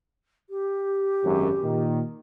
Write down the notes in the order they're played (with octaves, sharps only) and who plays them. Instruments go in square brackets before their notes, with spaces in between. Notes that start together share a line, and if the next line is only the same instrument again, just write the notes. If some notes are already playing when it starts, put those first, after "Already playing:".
[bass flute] G4
[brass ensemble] G#1 F#2
A#2 D#3